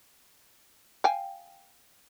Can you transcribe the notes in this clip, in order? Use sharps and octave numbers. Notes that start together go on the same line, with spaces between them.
F5 G5 G#5